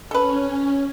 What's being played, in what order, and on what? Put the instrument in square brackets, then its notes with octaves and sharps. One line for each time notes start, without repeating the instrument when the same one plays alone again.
[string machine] C#4 [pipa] A4 B4